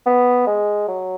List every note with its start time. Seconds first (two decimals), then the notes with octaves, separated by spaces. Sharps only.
0.06 B3
0.47 G#3
0.88 F#3